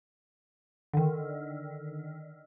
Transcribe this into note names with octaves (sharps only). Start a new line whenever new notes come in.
D3 D#3